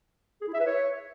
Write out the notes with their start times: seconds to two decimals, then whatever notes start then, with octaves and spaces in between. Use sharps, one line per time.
0.41 G#4
0.47 E4
0.54 E5
0.60 B4
0.66 C#5